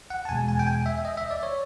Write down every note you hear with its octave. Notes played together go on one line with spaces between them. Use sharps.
F#5
A5
E2 B2 G#3 G#5
G#5
G5
G#5
E5
D#5
E5
D5
C#5